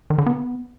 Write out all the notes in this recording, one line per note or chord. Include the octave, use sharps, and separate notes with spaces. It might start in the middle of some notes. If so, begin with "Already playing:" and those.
D#3
D3
B3